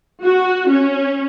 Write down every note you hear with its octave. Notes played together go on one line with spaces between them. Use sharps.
F#4
C#4